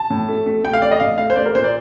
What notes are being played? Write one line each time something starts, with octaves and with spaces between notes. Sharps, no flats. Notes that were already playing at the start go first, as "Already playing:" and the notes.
Already playing: A5
A2
A3
A3
A3 G5
F5
A3 D5
D#5
A2 F5
A3 F5
C5
A3 D5
A#4
A#2 C5
D5